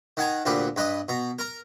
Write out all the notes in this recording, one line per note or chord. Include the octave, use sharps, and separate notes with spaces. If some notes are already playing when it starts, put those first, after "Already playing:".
D#3 F#5 G#5 A#5
D2 A#2 G4 B4
G2 B4 D#5 D#6
B2 A#5
A#4 A#5